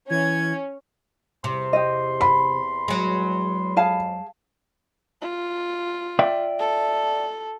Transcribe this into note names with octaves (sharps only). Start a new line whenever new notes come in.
E3 C#4 G#6
E2 C3 C6
G4 D#5
B5
F#3 G#3
F2 G#4 F5 A5
F4
D5 E5 G5
A4